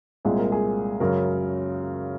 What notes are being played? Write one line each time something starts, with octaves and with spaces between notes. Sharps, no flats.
C2 A#2 G#3 C4 G#4
A#4
G#4
F#2 C#3 F#3 A#4